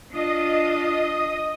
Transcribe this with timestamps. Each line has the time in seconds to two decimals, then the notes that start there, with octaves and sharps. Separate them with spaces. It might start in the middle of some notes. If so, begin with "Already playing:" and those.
0.12 D4 F4 D#5 D#6